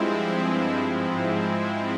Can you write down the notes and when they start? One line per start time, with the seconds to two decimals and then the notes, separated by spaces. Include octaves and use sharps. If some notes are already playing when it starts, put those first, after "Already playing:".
Already playing: G2 F3 G#3 C4 E4
0.81 G#2 F3 G#3 C4 E4